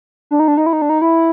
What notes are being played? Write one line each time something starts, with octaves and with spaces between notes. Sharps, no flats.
D4
D#4
D4
D#4
E4
D#4
D4
D#4
E4